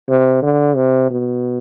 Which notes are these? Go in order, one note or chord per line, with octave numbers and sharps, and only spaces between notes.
C3
D3
C3
B2